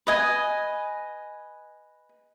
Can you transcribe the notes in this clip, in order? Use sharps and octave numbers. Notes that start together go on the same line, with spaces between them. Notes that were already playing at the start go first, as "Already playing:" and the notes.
B4 D#5 G#5